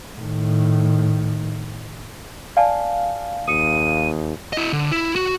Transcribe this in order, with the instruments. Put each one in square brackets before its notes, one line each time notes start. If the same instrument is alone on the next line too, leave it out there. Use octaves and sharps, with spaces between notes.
[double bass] A2 D#3
[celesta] D5 G#5 A5 [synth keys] F5
[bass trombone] D#2 [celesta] D#6 C#7 [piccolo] D#7
[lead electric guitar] E4 D#5
D3
E4
F#4